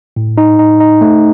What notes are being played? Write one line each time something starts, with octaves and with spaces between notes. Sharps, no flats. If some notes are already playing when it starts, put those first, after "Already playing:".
A2
D#4
D#4
D#4
A3